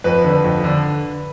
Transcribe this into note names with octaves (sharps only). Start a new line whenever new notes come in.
F2 B4
D3
F2
D3